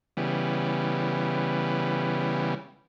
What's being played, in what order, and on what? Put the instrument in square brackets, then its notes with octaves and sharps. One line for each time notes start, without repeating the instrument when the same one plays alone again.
[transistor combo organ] C#3 E3 G3 B3